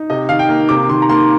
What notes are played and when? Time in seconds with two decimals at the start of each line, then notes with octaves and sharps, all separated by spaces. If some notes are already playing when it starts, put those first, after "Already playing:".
Already playing: D#4
0.10 C3 D#5
0.29 D#3 F5
0.39 G5
0.49 A#3
0.69 C3 D6
0.89 D#3 C6
1.02 A#5
1.10 A#3 C6